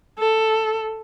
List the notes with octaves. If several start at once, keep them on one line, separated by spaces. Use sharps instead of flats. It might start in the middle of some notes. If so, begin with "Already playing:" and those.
A4